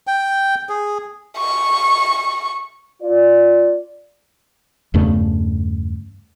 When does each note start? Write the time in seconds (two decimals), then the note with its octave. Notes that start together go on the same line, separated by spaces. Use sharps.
0.07 G5
0.69 G#4
1.37 C#6
3.02 F4 D5
4.94 E2 G2 C#3 A3